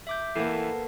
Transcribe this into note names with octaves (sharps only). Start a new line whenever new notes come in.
E5 D6 G6
E3 A#3 B3 A4 C7